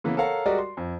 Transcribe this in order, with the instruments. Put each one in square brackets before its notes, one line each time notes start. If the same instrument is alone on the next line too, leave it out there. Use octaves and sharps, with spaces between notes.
[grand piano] C#3 E3 A#3 B3
A4 A#4 C#5 F5 F#5 A#5
G3 G#3 F#4 A#4 D5 D#5
C6
F2